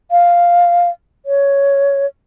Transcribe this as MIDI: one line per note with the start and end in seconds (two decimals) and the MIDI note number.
0.11 0.89 77
1.26 2.06 73